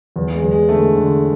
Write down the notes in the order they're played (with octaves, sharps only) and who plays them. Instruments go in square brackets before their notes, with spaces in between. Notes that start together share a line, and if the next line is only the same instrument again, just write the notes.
[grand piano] E2
[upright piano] G#3
[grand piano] E2
[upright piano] G#3
[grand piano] D3 [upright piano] A3
[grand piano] D3